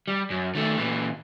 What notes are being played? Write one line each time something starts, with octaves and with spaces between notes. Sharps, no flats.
G3
F#2
D#3 A3
A#2 E3